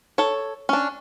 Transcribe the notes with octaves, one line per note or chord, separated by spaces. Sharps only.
A4 C#5
C#4 D4